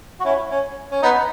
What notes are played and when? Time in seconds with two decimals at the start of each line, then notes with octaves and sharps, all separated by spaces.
0.20 F#4
0.25 C#4 E4
0.51 C#4
0.91 C#4
1.03 B3 D#4